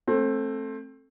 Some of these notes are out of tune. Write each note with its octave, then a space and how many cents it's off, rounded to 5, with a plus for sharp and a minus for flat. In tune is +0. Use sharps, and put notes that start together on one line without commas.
A3 +0 C4 +25